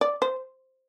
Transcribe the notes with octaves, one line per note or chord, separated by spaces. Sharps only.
D5
C5